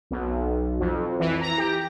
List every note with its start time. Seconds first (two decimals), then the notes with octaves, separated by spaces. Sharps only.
0.11 B1
0.79 F2
1.20 E3
1.41 A#5
1.58 G4